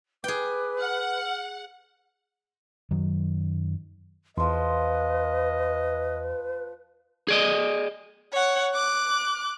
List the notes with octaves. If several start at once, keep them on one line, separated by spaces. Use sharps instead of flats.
G#4 B4 G5 D6
F#5 F6
F#2 D#3 F#3
E2 F3 B4 D#5 C6
G#4 D5 D#5
C#5 F#5
D6 F#6